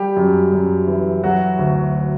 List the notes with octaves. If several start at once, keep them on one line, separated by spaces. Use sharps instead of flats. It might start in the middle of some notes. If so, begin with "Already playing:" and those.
Already playing: G3 G4
F#2
F#2
E3
F#3 F#4
D2